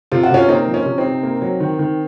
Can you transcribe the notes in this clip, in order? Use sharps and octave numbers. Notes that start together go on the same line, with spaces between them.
C3 F4
F#4
C3 C#4 F4
A#3 C4 D#4
F3
C#4
C3
C4 D#4
C3
A#3
F#3
D#3
D#3